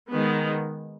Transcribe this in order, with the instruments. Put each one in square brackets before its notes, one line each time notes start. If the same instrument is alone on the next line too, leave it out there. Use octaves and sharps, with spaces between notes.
[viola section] D#3 G#3 B3